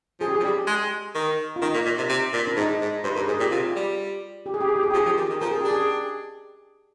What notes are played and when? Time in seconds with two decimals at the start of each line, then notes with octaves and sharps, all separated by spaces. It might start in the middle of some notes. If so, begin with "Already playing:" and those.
0.20 F3 G#4
0.28 G4
0.36 G#4
0.40 F3
0.44 G3 G4
0.67 G#3
1.15 D#3
1.56 F4
1.62 D#3 D#4
1.74 A#2
1.86 A#2
1.98 C3
2.09 C3
2.33 A#2
2.47 D4
2.56 G#2 D#4
2.81 G#2
3.04 G2 C5
3.16 G2 A#4
3.28 G#2 G#4
3.40 A#2 G4
3.51 C3 F4
3.76 G3
4.46 G4
4.54 G#4
4.60 G4
4.69 G#4
4.76 G4
4.83 G#4
4.91 G4
4.94 F3
4.98 G#4
5.05 F3 G4
5.17 D#3
5.30 D#3
5.41 F3 A#4
5.51 G#4
5.61 D4 G4
5.71 G#4